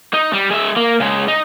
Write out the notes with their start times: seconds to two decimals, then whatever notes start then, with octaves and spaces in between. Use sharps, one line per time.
0.13 D#4
0.33 G3
0.50 G#3 E5
0.76 A#3
1.00 C#3 G#3
1.28 D#4